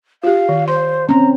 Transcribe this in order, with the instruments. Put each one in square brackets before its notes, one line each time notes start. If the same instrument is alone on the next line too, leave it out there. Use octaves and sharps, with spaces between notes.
[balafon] F4 G4 [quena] F5
[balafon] D#3
[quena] C5 [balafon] C6
[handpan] C4 C#4 [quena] A#5